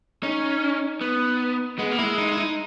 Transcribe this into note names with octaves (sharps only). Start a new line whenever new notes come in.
C#4 D#4
B3
G#3 B3
A#3
G#3 E4
D#4
E4
D#4